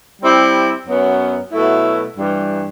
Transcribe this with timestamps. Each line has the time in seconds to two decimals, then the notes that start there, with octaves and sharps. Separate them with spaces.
0.22 G3 C4 E4 G4
0.87 F#2 F#3 B3
1.52 B2 F#3 A3 E4
2.17 G2 E3 G3